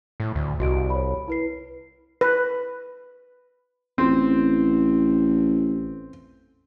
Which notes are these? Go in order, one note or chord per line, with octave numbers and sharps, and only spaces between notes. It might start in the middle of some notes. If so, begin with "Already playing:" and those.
A2
D2
C2 F#4 D#5 D7
C#5 B5
E4 B4 C7
B4
A1 C4